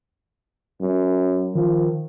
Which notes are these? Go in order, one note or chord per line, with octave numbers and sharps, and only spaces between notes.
F#2
D#3 F3